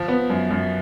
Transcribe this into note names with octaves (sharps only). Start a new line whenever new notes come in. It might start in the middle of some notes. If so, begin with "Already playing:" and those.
Already playing: F3
B3
F#2
F#2